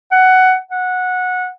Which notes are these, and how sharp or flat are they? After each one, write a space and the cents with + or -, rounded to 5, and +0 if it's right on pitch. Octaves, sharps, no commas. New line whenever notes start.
F#5 +10
F#5 -15